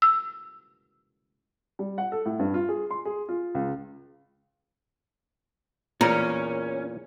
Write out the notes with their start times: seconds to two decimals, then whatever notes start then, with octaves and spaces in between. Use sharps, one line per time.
0.02 E6
1.79 G3
1.98 F#5
2.12 A4
2.26 A2
2.39 G2
2.54 F4
2.69 G#4
2.91 C6
3.05 G#4
3.29 F4
3.55 C#2
6.01 E2 A#2 C#4 A#4